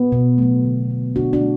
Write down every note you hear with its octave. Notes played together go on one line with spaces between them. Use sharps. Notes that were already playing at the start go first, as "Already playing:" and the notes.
Already playing: B3
B2
F#3 A3
D3
A3
D3 D4 F#4
D4 F#4
A3